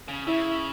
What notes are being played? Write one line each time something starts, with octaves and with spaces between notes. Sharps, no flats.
C#3
C#3 E4 E5